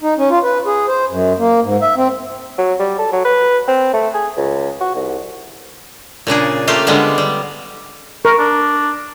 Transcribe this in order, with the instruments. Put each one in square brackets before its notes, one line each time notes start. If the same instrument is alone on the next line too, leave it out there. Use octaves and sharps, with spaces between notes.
[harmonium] D#4
C#4
F4
B4
G#4
C5
F#2
A#3
G#2
E5
C4
[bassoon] F#3
G3
A4
F#3
B4
C4
A3
G#4
C#2
F#4
C2
[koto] A#2 C#3 D4 G#4
A3 A#3 F4 G4 A4 F5
D3 G3 G#3 B3
G3
[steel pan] A#4 [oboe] C#6
[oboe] D4